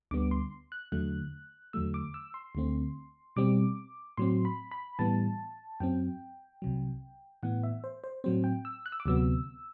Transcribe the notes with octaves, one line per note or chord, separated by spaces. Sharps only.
D2 D3 G3 B3 D6
C6
F#6
E2 D3 F#3 A3 F#6
E2 D3 F#3 A3 E6
D6
E6
C6
D2 D3 A3 C4
B2 G3 C4 D6
A2 F#3 C4 C6
B5
B5
A2 E3 G3 B3 A5
F#2 F#3 C4 G5
C2 C3 F#3
A2 E3 B3 F#5
E5
C5
C5
A2 F#3 C4 C5
G5
E6
F#6
E6
D6
D2 C3 F#3 B3 E6